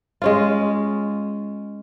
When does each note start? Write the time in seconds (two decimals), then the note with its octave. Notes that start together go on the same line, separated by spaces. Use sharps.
0.22 G#3 C#4 F4